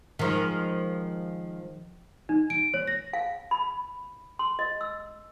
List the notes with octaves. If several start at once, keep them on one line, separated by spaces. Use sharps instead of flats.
D#3 F3 G#3
D#4
D7
C#5
A#6
F5
B5
C6
D#5
E6